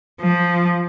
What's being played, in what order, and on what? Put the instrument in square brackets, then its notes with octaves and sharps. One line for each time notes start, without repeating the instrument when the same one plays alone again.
[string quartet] F3